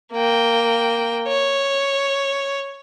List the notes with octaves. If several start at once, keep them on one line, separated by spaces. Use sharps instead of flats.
A#3 G5
C#5